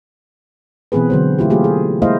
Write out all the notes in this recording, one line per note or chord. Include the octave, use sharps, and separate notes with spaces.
B2 E3 B3 C4 G#4 B4
D3 F#3 C5
A3 E4 F4 G4
F#3 A3 A#3 F4 G4 G#4
G#4
G#3 A#3 E4 C5 D#5 F5